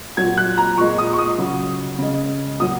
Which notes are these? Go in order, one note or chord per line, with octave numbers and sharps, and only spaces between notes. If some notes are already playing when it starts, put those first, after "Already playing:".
A#2 F#3 G#6
F#6
A#5
A#2 G#3 C#6
D#6
C#6
D#6
C#3 F#3
C#3 G#3
A#2 F#3 D#6